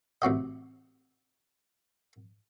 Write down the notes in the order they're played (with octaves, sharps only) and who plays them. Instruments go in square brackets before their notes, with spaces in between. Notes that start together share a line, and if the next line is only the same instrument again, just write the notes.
[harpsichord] A1 C3 F#4 D#5